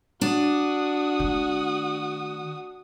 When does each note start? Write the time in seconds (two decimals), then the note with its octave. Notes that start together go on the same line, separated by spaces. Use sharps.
0.21 D4 F#4 D#6
1.20 D#3 A3